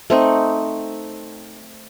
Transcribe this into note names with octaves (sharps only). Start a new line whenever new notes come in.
A3 C4 D#4